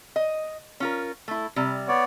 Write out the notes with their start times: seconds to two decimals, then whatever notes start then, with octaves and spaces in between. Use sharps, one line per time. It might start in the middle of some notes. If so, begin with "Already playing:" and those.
0.16 D#5
0.80 C#4 F4 A#4
1.28 A3 E4
1.56 C3 G3
1.88 B3 C#5 D5